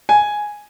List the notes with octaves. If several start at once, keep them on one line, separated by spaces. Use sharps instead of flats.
G#5